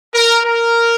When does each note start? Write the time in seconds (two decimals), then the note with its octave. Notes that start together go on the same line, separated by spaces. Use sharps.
0.15 A#4
0.45 A#4